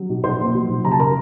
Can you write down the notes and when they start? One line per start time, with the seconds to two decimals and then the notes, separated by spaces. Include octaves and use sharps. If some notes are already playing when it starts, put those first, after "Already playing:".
Already playing: F#3
0.09 B1
0.24 B1 C5 C6
0.40 A#2
0.54 F#3
0.69 B1
0.84 F#1 A#5
0.91 A5
1.00 A#4 A#5